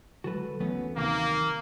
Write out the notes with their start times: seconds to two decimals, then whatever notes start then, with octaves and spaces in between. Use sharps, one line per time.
0.24 D3 F#3 G#3 F#4 A4 B4
0.60 D2 E3 F#3 A3 B3 C#4
0.97 C3 D#3 A#3